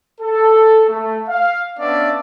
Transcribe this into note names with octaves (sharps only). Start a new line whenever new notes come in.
A4
A3
F5
B3 C#4 D4 D5 E5 F5